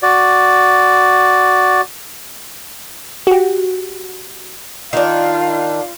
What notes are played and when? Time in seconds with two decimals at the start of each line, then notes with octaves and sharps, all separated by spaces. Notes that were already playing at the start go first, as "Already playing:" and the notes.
0.03 F#4 D5
3.27 F#4 G4
4.93 D#3 D4 F4